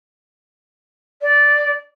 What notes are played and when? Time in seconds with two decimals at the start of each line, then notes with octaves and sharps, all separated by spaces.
1.22 D5